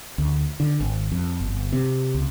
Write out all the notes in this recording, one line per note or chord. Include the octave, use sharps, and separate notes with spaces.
D2
D3
G#1
F2
G1
C3
C#2